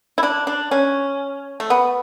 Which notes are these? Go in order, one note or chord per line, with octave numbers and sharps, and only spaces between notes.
E4
D4
D4
C#4
A3
B3